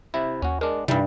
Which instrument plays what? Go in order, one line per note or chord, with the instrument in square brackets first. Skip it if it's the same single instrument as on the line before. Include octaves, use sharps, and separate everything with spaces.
[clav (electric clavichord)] C3 E4
[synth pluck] D#2 [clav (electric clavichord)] C#4 F#4
[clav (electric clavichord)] G#3 D4 [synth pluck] A#4
[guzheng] G2 G3 [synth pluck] C3 D#4 [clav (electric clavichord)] E3